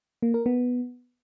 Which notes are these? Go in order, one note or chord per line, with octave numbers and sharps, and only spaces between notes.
A#3
A#4
B3